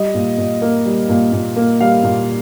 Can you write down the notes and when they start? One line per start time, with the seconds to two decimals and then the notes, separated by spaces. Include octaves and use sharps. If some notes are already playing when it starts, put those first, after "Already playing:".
Already playing: G3 D#5
0.15 A#2
0.38 A#2
0.62 A#3
0.85 G3
1.09 A#2
1.32 A#2
1.56 A#3
1.80 G3 F5
2.04 A#2